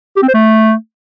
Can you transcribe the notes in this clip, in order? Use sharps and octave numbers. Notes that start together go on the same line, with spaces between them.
G4
C4
C5
A3